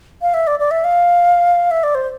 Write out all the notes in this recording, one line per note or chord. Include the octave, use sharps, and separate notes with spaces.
F5
E5
D5
D5
E5
F5
E5
D5
C5